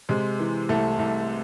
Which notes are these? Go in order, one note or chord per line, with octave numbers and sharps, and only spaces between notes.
C3 G#3
E3
C2 A3
C2